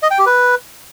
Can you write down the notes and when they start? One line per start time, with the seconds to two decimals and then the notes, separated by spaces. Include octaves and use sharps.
0.03 D#5
0.11 G5
0.19 G4
0.26 B4